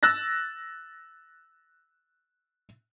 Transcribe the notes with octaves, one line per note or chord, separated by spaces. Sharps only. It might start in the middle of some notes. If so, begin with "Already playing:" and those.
E6 F#6 A6 A#6